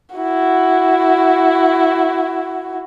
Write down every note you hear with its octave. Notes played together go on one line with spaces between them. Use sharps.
E4 F#4